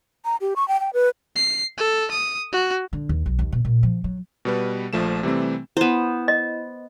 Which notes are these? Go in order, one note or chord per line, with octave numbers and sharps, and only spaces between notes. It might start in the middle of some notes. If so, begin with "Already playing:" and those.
A#5
G4
C#6
G5
G5
B4
C7
A4
D#6
F#4
D3
D#2
B1
D#2
B2
A#2
F3
F#3
B2 G3 B4
A#1 F3 A3 E7
C3 E3 G3 A3 C4
B3 E4 C5 E7
D#5